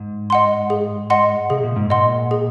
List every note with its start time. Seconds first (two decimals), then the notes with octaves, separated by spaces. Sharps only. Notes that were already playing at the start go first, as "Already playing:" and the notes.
Already playing: G#2
0.30 D#5 F#5 C6
0.70 G#4
1.10 D#5 F#5 C6
1.50 C3 G#4
1.64 A#2
1.76 G#2
1.90 A#2 D#5 F#5 C6
2.31 G#4